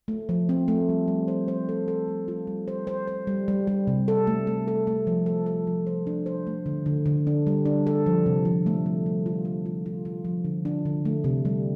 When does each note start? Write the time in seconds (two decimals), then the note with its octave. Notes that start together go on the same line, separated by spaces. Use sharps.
0.08 A3
0.29 F3
0.49 C4
0.68 A3
0.89 G3
1.08 G3
1.28 C5
1.48 C5
1.69 A4
1.88 A4
2.08 A3
2.28 F4
2.47 G3
2.68 C5
2.87 C5
3.08 C5
3.27 G3
3.48 G3
3.67 G3
3.87 C3
4.08 A4
4.27 A3
4.47 A3
4.68 A4
4.87 A3
5.07 F3
5.26 A4
5.46 A4
5.67 F3
5.87 C5
6.07 D4
6.26 C5
6.47 A3
6.66 D3
6.86 D3
7.06 D3
7.27 D4
7.47 G3
7.65 D4
7.87 A4
8.06 F3
8.26 C3
8.45 F3
8.66 A3
8.86 G3
9.06 G3
9.26 F4
9.45 A4
9.65 F4
9.86 F4
10.05 F4
10.25 F3
10.44 D3
10.65 D4
10.86 D3
11.05 A3
11.24 C3
11.45 G3